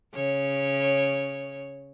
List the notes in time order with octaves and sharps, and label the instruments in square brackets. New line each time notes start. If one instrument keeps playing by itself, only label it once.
[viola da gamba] C#3 C#5